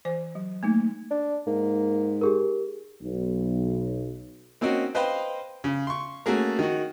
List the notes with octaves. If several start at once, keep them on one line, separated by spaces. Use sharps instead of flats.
E3 C5 G#5
F#3
A3 A#3 D#4
D4
G#2 A#3
G4 G#4 A#4
B1
A#3 C4 C#4 D#4 F#4
B4 C5 D#5 F5 G5 B5
C#3
C6 C#6
A3 A#3 C#4 F#4 G#4 A#4
D#3 F#4